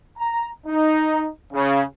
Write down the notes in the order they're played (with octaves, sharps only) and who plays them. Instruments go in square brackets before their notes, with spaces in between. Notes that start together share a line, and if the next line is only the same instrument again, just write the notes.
[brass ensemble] A#5
D#4
C#3